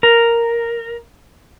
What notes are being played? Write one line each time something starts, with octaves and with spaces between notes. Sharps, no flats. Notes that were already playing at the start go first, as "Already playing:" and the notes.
A#4